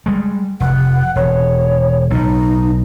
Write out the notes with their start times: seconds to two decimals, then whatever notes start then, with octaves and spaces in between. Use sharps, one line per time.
0.06 G3 G#3
0.60 F1 F#5
1.16 E1 C#5
2.10 B1 A2 D#4